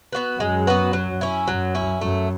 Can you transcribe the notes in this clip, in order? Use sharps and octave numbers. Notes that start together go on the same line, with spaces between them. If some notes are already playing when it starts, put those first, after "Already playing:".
B3 F#4 B4
F#2 G#3
B3 F#4 B4
F#3
C#4 E4
F#2 F#3
C#4 E4
F#2 A3